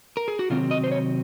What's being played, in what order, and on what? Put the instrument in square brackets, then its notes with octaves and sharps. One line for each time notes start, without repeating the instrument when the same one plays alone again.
[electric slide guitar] A#4
G#4
F#4
C3 D#3 F#3 C4 F4
D#5
C5
C#5